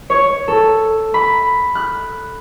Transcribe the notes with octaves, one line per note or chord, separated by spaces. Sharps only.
C#5
A4
B5
F#6